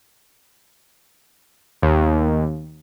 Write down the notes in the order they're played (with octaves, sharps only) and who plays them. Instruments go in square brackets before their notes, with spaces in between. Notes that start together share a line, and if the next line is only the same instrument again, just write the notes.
[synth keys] D#2